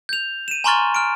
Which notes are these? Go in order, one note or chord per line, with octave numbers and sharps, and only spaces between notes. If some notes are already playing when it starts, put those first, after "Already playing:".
G6 F7
D#7 E7
G#5 A#5 C6 C#6 F6 A6
F6 D7